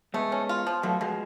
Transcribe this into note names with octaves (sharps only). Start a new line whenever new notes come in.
G#3 A3 B3
C#4
F4
F3
B2 F#3 A3
B2 F3 G#3